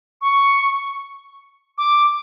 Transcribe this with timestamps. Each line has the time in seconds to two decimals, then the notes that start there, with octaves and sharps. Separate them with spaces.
0.21 C#6
1.77 D6